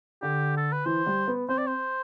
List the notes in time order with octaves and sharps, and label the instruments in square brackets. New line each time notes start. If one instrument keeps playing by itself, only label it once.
[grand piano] D3 [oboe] G4
[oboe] A4
B4
[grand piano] E3 [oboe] C5
[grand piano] G3
B3
[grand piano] C4 [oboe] C5
[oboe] D5
C5